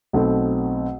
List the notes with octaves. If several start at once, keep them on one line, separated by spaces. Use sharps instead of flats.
B1 B2 A3 C4